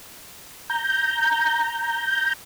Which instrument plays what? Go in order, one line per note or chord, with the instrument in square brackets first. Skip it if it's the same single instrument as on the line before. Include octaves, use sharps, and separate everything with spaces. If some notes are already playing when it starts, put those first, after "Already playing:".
[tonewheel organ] A#5 G6